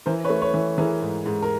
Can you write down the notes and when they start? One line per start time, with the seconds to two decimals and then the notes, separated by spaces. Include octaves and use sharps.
0.06 E3 A#4 C5
0.24 B4 C#5
0.30 A3
0.42 B4 C#5
0.54 E3
0.78 E3 G#4 A#4
1.01 G#2
1.26 G#2
1.42 A#4